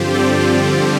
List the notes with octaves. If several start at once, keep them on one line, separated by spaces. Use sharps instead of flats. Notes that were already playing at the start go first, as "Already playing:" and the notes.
Already playing: G2 D3 F3 C4 F4 G4 C5
A4 D5